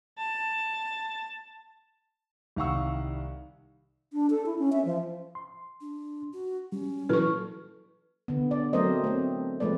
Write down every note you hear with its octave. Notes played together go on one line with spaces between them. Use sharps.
A5
C2 D#3 F5 F#5 C#6 E6
D4
A4
E4
C#4
E5
F3
C6
D4
F#4
G3 C#4
A#2 E3 F#3 A4 B4 C#6 F6
D3 B3
D5
F#3 A3 C4 A#4 C5 D#5
A3 C4
F3 G#3 A3 C4 B4 D5